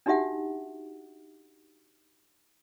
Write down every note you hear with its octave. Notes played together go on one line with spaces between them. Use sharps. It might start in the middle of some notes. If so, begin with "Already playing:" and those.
D4 D#4 F#4 G4 E5 F#5